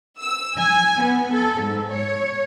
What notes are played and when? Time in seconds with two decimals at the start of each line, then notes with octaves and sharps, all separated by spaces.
0.20 E6
0.56 G#5
1.02 B3
1.32 A4
1.61 G#2
1.94 C#5